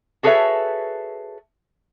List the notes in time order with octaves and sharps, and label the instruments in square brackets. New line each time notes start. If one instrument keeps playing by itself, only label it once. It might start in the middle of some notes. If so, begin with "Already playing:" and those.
[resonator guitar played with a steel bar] F#4 G#4 A4 B4 C#5 E5